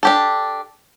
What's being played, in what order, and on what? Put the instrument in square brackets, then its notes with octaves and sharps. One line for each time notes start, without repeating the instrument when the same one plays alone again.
[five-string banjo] D4 G4 A4